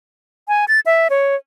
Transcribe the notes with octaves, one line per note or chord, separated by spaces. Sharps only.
G#5
A6
E5
C#5